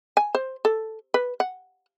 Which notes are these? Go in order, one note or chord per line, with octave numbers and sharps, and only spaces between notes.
G#5
C5
A4
B4
F#5